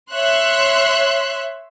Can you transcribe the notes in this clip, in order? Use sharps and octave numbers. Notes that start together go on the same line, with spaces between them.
C#5 E5 C6 F#6